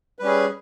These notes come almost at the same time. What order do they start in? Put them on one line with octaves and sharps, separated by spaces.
B4 G3 C#4 G#4